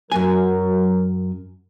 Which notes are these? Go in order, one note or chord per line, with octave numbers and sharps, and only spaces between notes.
F#2 F#3 A#4 G#5